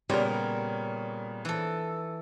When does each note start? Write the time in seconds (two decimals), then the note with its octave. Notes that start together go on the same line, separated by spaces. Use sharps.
0.10 A#2 C#3 G3 B3 A#4 C#5
1.45 E3 A4